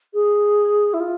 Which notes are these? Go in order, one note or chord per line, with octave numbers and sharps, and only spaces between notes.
G#4
E4
F4